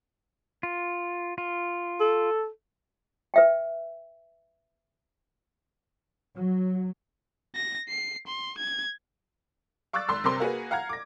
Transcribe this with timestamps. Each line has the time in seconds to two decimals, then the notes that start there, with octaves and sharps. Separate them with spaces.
0.63 F4
1.38 F4
2.00 A4
3.34 B4 E5 G5
6.36 F#3
7.55 A#6
7.89 C7
8.27 C6
8.58 G#6
9.93 F5 C#6 D6 E6 F#6 A6
10.09 G#1 C6 E6
10.24 G1 C3 C4 A#4 C6 E6
10.40 A#3 F#4 G#4 B4
10.71 F5 F#5 A#5 F6 G#6
10.89 D6 A#6